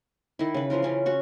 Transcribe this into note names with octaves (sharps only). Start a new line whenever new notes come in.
D#3 E4
C#3 B4
E3 F3 F4 A#4
E3 C#4 F4
C#4 F#4 C#6